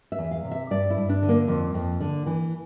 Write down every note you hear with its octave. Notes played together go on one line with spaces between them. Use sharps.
E5
E2
F5
C3
E5
G2 D5
E4
G2
D4
D3
A#3
F2
F2
D3
E3